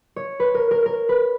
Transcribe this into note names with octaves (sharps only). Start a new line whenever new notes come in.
C#5
B4
A#4
A#4
A#4
B4